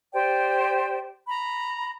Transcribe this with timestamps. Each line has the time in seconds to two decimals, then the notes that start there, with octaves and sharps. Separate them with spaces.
0.13 G4 C5 D5 G5
1.28 A#5 B5